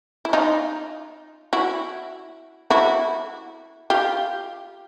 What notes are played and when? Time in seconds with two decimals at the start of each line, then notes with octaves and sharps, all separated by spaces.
0.25 E4
0.33 D#4 F4
1.53 E4 F#4
2.70 E4 F#4
3.90 F4 G4